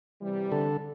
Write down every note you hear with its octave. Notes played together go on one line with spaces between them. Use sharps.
C3 E3 G3
D3 A4